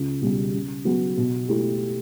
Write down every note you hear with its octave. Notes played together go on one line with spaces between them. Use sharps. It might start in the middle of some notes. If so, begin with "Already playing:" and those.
Already playing: C#2
B2 G3
C#3
F#3 B3 F#4
B2
A3 E4 G4